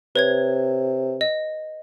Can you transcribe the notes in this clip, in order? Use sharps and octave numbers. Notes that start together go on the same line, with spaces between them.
C3 B4 C#5 G#6
D#5